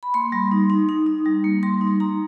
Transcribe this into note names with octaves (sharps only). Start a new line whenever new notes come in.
B5
A#3 C6
G3
D#4
D#4
D#4
D#4
G3
A#3
G3 C6
D#4
D#4 A#5